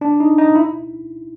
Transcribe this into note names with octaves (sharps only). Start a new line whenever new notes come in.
D4
D#4
D#4
E4